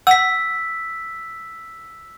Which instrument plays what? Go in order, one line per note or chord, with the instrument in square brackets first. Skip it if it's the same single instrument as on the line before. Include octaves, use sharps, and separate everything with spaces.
[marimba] F#5 [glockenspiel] E6 B6